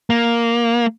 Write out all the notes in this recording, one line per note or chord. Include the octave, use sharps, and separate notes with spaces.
A#3